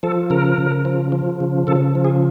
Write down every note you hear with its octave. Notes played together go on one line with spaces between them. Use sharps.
F3 A4
C#3 A#4
C#3
F3
F3
C#3
C#3 A4
F3
G#4